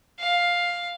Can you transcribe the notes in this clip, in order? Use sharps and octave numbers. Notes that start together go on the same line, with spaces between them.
F5